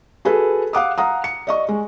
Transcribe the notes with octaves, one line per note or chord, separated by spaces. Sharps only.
F#4 G#4 A4 B4
F5 F#5 D6 D#6
F5 F#5 A#5 D#6
C#7
D5 D#5 C#6
G#3